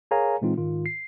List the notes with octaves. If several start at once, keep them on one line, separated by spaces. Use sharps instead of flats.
G#4 A#4 C#5 F5 G#5 A#5
A#2 E3 G#3 C4 D#4 F4
G#2 D#3 F4
C7